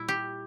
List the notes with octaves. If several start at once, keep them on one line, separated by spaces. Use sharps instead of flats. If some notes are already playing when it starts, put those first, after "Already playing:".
Already playing: A#2 G3 E4
G4